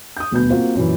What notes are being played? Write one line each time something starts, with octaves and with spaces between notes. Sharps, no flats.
D#6 G6
D#1 D2 B2 B3 G6
A#3 C4 F4 F#4
F#2 A#2 E3